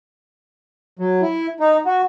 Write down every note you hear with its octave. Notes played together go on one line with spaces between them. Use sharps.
F#3
E4
D#4
F#4